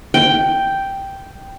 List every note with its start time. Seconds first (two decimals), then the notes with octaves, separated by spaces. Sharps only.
0.14 G5